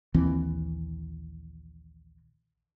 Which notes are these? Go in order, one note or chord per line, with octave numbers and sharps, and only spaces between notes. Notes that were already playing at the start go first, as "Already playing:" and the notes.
A#1 D#2 E3 C4